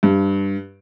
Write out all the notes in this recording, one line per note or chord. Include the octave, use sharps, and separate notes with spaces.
G2